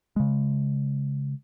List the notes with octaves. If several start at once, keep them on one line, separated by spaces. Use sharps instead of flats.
C#3 G#3